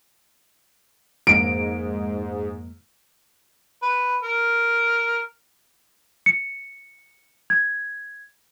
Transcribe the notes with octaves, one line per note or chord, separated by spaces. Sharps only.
F2 G#2 A#3 D7
B4
A#4
C#7
G#6